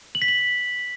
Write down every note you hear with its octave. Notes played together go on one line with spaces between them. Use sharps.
F#7
B6
F#7